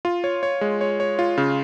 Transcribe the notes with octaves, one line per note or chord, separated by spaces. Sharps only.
F4
C#5
C#5
G#3
C#5
C#5
F4
C#3